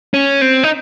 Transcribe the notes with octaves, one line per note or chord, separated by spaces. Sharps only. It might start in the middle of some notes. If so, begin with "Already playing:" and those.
C#4
C4
D#4